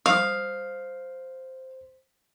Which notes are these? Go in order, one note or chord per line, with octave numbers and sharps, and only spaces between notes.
C5 F5 D#6